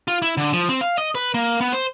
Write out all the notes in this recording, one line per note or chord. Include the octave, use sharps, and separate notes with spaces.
F4
E4
D3
F3
C4
F5
D#5
B4
A#3
B3
C5